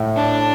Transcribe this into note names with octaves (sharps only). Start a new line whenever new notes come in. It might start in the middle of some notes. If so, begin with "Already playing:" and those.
Already playing: A2
D4